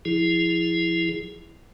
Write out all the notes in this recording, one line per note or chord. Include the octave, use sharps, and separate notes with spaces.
F3 E4 G#4